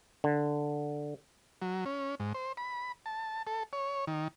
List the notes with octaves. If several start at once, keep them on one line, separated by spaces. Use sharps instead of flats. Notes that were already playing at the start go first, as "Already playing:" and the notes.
D3
F#3
C#4
G#2
C5
B5
A5
A4
C#5
D#3